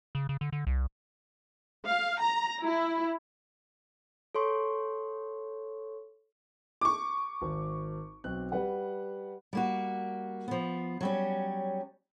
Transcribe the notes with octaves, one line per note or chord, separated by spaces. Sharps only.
C#3
C#3
D3
D3
C2
F5
A#5
E4
A4 C#5 C6 C#6
C#6 D6
G#1
B1 C4 F#6
G3 B4 F#5
G3 A#3 F#4
F3 B3
F#3 G3 C#4